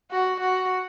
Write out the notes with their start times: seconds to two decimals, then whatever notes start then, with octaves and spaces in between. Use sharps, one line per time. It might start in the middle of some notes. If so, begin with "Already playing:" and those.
0.11 F#4
0.40 F#4